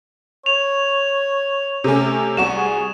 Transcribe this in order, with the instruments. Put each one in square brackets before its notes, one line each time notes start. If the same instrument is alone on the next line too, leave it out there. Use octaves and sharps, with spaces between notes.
[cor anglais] C#5 [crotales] F7
[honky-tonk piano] C3 A3 C#4
[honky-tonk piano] C2 F#4 C#6 [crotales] E7
[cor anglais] G#4